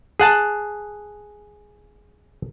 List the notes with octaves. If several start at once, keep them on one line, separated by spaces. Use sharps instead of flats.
G#4 F#5 A5